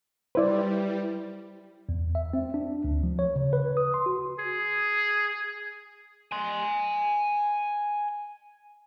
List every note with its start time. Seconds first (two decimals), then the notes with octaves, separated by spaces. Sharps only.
0.35 G3 E4 B4 C5 D5
1.89 E2
2.15 E5
2.33 C4
2.54 D4
2.84 D2
3.03 F3
3.19 C#5
3.36 C#3
3.53 B4
3.77 D#6
3.94 C6
4.06 F#4
4.39 G#4
6.32 G#5 C6